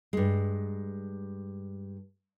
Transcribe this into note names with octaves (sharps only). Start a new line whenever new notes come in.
G2 G#3